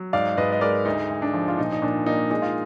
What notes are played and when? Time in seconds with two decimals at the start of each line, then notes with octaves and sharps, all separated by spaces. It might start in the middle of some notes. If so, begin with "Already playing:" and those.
Already playing: F#3
0.13 G#2 D5 F5
0.37 G#2 B4 D#5
0.52 D#5
0.61 G#3 A#4 D5
0.85 D2 D#4
1.10 D2
1.22 D4
1.33 F3
1.48 F4
1.58 A#2 D#4
1.72 D#4
1.82 A#2 D4
2.06 A#3 D#4
2.30 G#3 D#4
2.42 F4